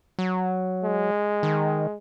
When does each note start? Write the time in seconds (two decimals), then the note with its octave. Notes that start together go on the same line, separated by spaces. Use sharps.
0.19 F#3
0.84 G#3
1.43 D#3